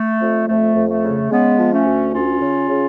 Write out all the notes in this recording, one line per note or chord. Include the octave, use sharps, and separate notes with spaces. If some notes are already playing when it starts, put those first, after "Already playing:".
Already playing: A3
F2
F2 A3
F2
A3
C#3
C#3 G#3 B3
F3
A3 C#4
D2
D2 C#4 F4
C#3
C#3